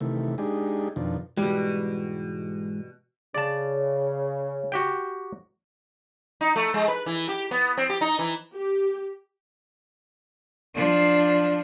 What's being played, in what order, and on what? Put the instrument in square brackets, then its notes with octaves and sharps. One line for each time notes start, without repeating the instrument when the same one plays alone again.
[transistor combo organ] C3 D#3 E3 A3
G#3 D4 D#4 G4 G#4
F2 B2 D#3 F3 D4
[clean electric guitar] G#2 E3 G#3 [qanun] B2 G3
[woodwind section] C#3 [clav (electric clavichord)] D5 A5
[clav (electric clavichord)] F#4 G4 G5
[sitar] D#4
A3
G#3
B4
E3
G4
B3
C4
G4
D#4
E3
[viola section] G4
[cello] F3 D4